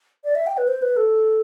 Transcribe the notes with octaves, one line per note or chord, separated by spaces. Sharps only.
D5
E5
G5
B4
C5
B4
A4